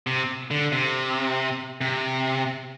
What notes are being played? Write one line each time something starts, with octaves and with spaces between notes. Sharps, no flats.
C3
D3
C3
C3